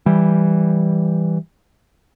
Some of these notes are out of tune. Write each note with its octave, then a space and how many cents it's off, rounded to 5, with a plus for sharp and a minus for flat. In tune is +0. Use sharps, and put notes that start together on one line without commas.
E3 +0 G3 +0